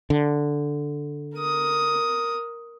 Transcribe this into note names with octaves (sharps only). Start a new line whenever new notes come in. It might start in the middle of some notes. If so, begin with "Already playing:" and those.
D3
A#4 D#6